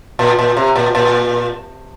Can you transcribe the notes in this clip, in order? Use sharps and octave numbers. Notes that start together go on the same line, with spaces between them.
A#2
A#2
C3
A#2
A#2